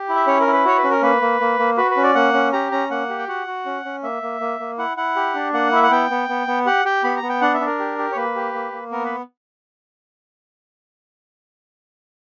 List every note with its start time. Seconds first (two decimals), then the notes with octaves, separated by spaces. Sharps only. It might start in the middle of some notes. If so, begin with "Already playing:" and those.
Already playing: G4
0.09 E4
0.15 E5
0.27 C#4 C#5
0.40 A#4
0.47 E4
0.53 B4
0.65 F#4 C#5
0.78 B4
0.84 C#4
0.91 A#4
1.02 A#3 B4
1.21 A#3
1.41 A#3
1.59 A#3
1.77 F#4 B4
1.91 B4
1.97 C#4
2.03 D5
2.15 A#3 F#5
2.34 C#4
2.53 G4 A#5
2.72 C#4 A#5
2.90 A#3 F#5
3.09 G4
3.19 G5
3.28 F#4 F#5
3.47 F#4
3.66 C#4
3.85 C#4
4.03 A#3 E5
4.22 A#3
4.41 A#3
4.60 A#3
4.78 E4 F#5
4.97 E4 F#5
5.16 G4
5.35 D4
5.53 A#3 F#5
5.72 E4 E5
5.83 F#5
5.91 B3 G5
6.11 B3
6.29 B3
6.47 B3
6.66 G4 F#5
6.85 G4 G5
7.04 B3 B5
7.17 A#5
7.22 B3
7.29 G5
7.41 D4 F#5
7.54 E5
7.61 D4
7.66 A#4
7.79 G4
7.98 G4
8.12 C#5
8.16 A#3 B4
8.35 G4
8.54 A#3
8.73 A#3
8.91 B3 A#4
9.05 B4